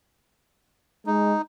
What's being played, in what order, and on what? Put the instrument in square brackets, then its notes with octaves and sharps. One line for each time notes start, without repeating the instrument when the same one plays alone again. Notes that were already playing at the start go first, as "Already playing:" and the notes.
[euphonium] G#3 [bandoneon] D#4